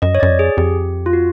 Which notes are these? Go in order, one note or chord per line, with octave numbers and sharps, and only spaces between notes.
F#2 D#5
C#5
F#2 D5
F2
G#4
F2 G4
F4
F#4